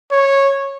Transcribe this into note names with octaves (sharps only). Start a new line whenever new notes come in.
C#5